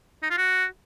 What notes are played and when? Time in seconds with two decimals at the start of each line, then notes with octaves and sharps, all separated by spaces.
0.23 D#4
0.31 F4
0.38 F#4